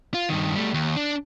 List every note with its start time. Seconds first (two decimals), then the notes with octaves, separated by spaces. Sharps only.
0.14 F4
0.29 G2 D#3
0.56 G3 A3
0.74 D#2
0.97 D4